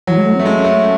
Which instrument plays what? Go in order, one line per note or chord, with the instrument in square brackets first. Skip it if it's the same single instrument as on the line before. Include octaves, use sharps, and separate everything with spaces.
[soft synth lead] E3 [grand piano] F#3
[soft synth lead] G#3
A3
C4
[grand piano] A3
[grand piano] G#3 [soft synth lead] C#4
[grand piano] A3